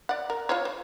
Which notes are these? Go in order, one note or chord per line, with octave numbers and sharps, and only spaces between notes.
D5 F#5
A#4
F4 C5 C#5
C5